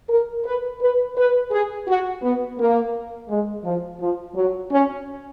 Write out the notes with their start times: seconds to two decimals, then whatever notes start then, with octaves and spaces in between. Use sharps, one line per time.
0.09 A#4
0.45 B4
0.81 B4
1.17 B4
1.51 G#4
1.88 F#4
2.22 B3
2.58 A#3
3.29 G#3
3.64 F3
4.00 F3
4.36 F#3
4.71 C#4